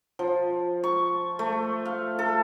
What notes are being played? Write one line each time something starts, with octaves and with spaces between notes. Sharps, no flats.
F3
C#6
A3
F5
A4